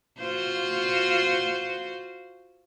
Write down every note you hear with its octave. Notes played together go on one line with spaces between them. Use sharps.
F4 F#4 C5